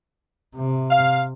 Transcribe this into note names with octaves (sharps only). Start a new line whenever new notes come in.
C3
F5